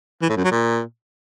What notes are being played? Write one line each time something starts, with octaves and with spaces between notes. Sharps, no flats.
E3
A2
F#2
F#3
A#2